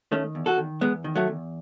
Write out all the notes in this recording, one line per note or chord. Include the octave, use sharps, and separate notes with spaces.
D#3 A3 C#4
E2
F#4 A4
D#3
E2 G#3 B3
D#3
F#3 A3
E2